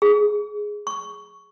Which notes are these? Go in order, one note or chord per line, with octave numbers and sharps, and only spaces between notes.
G#4
C#6